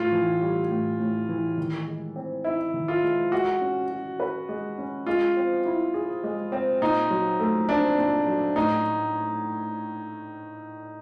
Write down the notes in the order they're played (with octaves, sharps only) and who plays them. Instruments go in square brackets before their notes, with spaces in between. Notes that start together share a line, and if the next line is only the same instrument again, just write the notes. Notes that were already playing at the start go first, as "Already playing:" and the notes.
Already playing: [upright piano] A2 [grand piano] F4
[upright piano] E3
G3
A2
A2
E3
D#3
G#3
C4
[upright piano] D#4 [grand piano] E4
[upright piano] D#3
[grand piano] F4
[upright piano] G#3
[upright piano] G#3 [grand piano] F#4
[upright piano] C#4
F#4
B4
G#3
C#4
[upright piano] G#3 [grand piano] F4
[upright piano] C4
E4
G#4
G#3
C4
[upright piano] A#2 [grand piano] D#4
[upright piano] F#3
A3
[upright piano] C4 [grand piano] D4
[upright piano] A#2
F#3
[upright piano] A2 [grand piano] D#4